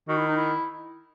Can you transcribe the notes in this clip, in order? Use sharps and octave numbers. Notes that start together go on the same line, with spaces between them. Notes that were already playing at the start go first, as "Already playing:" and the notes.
D#3 F#4
E4
D#4
E4